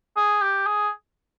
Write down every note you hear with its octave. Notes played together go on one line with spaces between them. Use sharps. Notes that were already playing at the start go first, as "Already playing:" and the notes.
G#4
G4
G#4